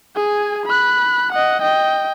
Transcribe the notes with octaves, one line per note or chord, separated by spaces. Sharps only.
G#4 G#5
B5 F#6
D#5 F#5
D#5 G5